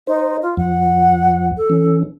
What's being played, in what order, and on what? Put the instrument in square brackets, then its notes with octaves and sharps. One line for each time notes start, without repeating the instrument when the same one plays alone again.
[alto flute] D#4 [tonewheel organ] C5
[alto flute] F4
[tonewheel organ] F2 F3 [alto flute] F#5
[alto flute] A4
[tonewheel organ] E3 C#4